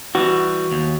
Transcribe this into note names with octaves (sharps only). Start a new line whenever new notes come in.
E3 G3 F#4
D#2